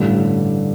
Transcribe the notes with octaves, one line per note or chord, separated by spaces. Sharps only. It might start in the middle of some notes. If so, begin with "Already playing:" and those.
Already playing: A1 G2 D3